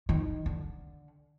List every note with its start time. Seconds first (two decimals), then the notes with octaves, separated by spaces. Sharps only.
0.09 D#3
0.46 D3